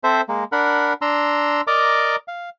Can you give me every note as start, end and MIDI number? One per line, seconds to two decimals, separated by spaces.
0.04 0.21 60
0.04 0.21 69
0.04 0.21 72
0.04 0.21 76
0.29 0.44 56
0.29 0.44 58
0.52 0.93 62
0.52 0.93 70
0.52 0.93 78
0.52 0.93 83
1.02 1.61 62
1.02 1.61 82
1.02 1.61 84
1.02 1.61 88
1.67 2.16 70
1.67 2.16 74
1.67 2.16 75
1.67 2.16 82
1.67 2.16 86
2.28 2.49 77